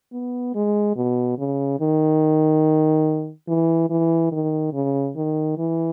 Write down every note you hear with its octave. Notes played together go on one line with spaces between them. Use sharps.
B3
G#3
B2
C#3
D#3
E3
E3
D#3
C#3
D#3
E3